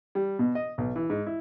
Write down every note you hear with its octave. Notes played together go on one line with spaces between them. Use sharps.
G3
B2
D#5
B1
E3
G#2
E4